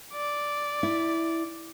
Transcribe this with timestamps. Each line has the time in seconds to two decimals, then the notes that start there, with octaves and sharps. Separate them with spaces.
0.13 D5
0.83 E4